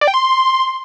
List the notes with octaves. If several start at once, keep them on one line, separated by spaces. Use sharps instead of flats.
D5
G5
C6